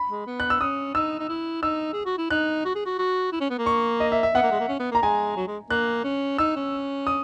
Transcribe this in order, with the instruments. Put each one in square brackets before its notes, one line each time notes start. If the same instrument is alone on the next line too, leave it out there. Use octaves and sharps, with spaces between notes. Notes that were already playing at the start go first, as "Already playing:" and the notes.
Already playing: [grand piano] B5
[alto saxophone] G#3
B3
[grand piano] F#6
E6
[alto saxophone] C#4 [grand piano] D#6
[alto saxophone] D#4 [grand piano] E6
[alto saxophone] D#4
E4
[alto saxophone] D#4 [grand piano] E6
[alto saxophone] G#4
F#4
E4
[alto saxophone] D#4 [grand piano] F#6
[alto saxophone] F#4
G#4
F#4
F#4
E4
C#4
B3
A#3
[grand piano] C#6
D#5
E5
E5
[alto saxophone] B3 [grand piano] F#5
[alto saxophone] A#3
G#3
A#3
C#4
B3
[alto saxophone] A#3 [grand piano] A#5
[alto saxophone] G#3 [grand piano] G#5
[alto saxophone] F#3
G#3
[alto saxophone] A#3 [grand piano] F#6
[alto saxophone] C#4
[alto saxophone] D#4 [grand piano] E6
[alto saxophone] C#4
[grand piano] D#6